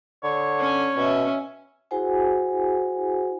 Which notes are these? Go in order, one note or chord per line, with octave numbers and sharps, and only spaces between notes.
D3 C#5
C#4 G#5
B2 C#4 E5
E4 F#4 G#4 C5 F#5 G#5